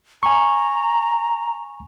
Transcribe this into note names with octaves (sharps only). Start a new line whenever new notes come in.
G#5 A#5 C#6